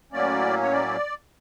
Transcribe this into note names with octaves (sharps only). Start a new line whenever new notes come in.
A2 F#3 A#3 C#4 D5
C#5
D5